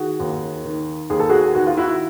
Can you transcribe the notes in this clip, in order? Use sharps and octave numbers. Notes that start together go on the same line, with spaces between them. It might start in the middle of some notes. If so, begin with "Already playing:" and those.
Already playing: D#3 F#4 G#4
D#2
D#3
D#2 G#4
A4
F#4 G#4
D#3 F#4
F4
E4 F#4